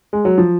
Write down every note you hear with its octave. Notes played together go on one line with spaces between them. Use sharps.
G#3
F#3
F3